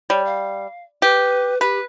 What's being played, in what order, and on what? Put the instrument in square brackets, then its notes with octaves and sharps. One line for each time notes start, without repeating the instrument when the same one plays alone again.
[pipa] G3 [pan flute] C#5
[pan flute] F5
[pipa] G4 [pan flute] B4
[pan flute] G4 [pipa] B4